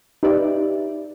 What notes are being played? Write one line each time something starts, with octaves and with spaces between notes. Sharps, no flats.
D#4 G4 B4 D5 E5